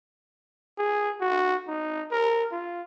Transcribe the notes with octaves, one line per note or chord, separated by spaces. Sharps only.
G#4
F#4
D#4
A#4
F4